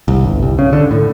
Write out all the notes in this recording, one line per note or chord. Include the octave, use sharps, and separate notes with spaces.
C2
G1
C2
C#3
D3
A2